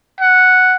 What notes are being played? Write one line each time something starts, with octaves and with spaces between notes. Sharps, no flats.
F#5